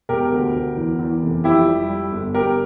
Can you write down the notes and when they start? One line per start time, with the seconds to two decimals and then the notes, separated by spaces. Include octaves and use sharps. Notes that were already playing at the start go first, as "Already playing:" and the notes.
0.09 E1 G4 A#4
0.32 D2
0.54 D2
0.77 E2
0.99 E2
1.22 F1
1.44 F2 E4 G4
1.67 G3
1.89 G3
2.12 G1
2.34 G1 G4 A#4